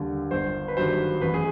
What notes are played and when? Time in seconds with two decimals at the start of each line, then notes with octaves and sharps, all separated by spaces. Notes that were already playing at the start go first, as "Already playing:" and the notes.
Already playing: D#2 D3 G3
0.31 G1 C5
0.68 B4
0.76 G2 D#3 F#3 C5
1.21 A1 B4
1.34 G#4